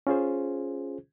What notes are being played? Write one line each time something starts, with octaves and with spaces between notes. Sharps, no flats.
C#4 F4 G#4 C5